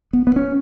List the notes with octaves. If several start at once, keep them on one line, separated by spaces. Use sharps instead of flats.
B3
B3
C#4